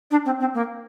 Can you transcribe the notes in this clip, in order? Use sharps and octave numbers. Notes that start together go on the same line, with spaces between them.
D4
C4
C4
A#3